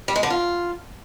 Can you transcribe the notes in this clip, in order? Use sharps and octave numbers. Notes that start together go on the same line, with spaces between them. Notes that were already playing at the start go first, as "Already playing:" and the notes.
G3
G#3
D3
F4